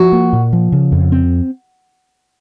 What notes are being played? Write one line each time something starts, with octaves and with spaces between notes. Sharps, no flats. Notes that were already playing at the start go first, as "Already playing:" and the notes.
Already playing: F3 F#4
A#3
A#2
F3
C#3
F2
C4